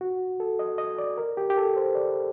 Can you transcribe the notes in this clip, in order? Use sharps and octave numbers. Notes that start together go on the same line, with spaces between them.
F#4
A4
D#5
D#5
D5
A#4
G4
G4
A4
C5
D5